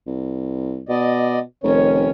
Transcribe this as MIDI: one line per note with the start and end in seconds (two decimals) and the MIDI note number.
0.07 0.82 36
0.89 1.40 47
0.89 1.39 74
0.89 1.39 75
1.64 2.11 29
1.64 2.10 51
1.64 2.10 61
1.64 2.10 73